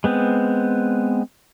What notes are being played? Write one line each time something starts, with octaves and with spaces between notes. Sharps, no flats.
G#3 B3 C4